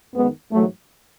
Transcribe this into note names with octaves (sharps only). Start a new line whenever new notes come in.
F#2 D#3 G#3 B3
G#2 E3 F#3 A3